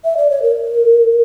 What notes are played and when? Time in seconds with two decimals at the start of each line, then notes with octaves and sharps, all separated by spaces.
0.04 E5
0.17 D5
0.30 C#5
0.42 A#4